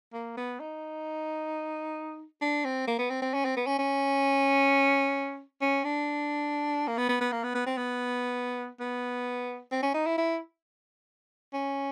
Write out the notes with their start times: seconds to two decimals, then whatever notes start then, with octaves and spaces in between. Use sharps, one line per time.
0.13 A#3
0.37 B3
0.60 D#4
2.41 D4
2.65 C4
2.87 A#3
2.99 B3
3.10 C4
3.22 C4
3.34 C#4
3.45 C4
3.56 B3
3.67 C#4
3.79 C#4
5.61 C#4
5.84 D4
6.87 A#3
6.97 B3
7.09 B3
7.21 B3
7.32 A#3
7.44 B3
7.55 B3
7.66 C4
7.77 B3
8.80 B3
9.72 C4
9.82 C#4
9.94 D#4
10.06 E4
10.18 E4
11.53 C#4